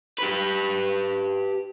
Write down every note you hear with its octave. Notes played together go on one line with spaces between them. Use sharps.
G4 B4